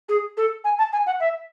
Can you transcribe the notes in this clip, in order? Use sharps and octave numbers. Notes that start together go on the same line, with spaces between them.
G#4
A4
G#5
A5
G#5
F#5
E5